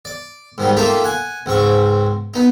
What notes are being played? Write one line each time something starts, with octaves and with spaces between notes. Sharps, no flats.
D5
G#2 D#3 G3
A#3 D#4 F4 G4 A4 E5
F#5 G#5
C#2 G#2 C4 C#6
B3 D#4